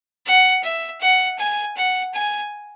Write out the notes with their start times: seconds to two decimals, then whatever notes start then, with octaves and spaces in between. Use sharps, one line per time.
0.26 F#5
0.63 E5
1.01 F#5
1.39 G#5
1.77 F#5
2.14 G#5